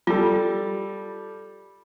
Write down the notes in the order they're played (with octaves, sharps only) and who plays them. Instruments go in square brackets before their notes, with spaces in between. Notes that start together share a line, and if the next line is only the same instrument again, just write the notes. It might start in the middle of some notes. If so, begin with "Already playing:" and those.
[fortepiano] G3 A4 [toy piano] F4